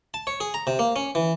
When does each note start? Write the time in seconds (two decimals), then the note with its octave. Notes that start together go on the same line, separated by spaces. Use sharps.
0.14 A5
0.27 C#5
0.41 G#4
0.54 A#5
0.67 C3
0.79 A#3
0.96 C#4
1.15 E3